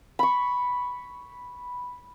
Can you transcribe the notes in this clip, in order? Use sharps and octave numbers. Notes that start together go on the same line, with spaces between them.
B5 C#6